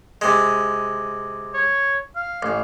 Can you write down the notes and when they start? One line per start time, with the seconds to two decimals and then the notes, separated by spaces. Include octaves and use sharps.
0.21 C3 G#3
1.54 C#5
2.16 F5
2.43 A1